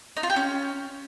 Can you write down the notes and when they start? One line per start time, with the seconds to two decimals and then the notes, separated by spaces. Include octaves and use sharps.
0.17 D#4
0.23 F4
0.30 G4
0.36 C#4